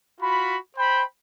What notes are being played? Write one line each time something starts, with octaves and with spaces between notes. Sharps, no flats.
F4 F#4 B5
C5 G5 B5